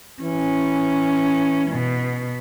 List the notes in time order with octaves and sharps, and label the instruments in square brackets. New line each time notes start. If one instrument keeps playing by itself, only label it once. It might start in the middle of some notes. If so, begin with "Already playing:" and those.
[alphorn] E3 [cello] C#4
[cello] B2